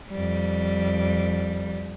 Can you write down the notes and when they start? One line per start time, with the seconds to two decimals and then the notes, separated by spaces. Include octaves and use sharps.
0.10 F2 G3